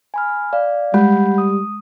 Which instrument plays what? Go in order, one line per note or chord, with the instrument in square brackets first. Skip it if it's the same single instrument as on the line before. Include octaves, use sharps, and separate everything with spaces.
[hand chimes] G#5 B5 F6
D5 F5
[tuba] G3 [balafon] G#3 [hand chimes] F#5 B5 G6
[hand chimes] D#6